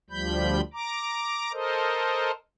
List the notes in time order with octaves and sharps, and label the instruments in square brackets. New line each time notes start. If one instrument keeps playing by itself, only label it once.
[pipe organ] D2 F3 G3 B5 G6
A#5 D6
A4 A#4 C5 D#5